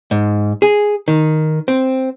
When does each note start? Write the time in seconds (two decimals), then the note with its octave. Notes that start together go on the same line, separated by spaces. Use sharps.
0.11 G#2
0.62 G#4
1.08 D#3
1.68 C4